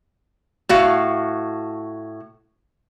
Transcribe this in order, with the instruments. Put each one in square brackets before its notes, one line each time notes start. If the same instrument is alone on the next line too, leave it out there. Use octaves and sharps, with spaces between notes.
[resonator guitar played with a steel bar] A2 F#4 F5